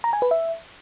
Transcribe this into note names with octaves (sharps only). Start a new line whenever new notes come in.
A#5
G#5
B4
E5